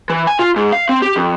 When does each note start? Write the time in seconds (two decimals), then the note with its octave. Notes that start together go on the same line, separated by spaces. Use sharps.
0.10 E3
0.27 G#5
0.39 F4
0.56 G#2
0.73 F5
0.89 C4
1.02 G4
1.16 F2